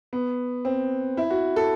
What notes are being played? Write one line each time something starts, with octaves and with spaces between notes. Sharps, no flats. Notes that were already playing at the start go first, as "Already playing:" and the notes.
B3
C4
E4
F#4
A4